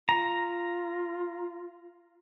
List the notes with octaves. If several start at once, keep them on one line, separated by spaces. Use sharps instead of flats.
F4 A#5